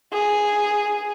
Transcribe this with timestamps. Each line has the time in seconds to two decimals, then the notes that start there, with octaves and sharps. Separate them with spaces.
0.14 G#4